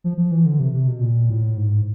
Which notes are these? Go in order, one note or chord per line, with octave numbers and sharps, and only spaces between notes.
F3
F3
E3
D3
C3
C3
B2
A#2
A2
G#2